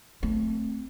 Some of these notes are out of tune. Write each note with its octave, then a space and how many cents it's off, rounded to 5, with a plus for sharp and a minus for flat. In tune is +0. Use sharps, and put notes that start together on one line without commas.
A3 +0 C4 +0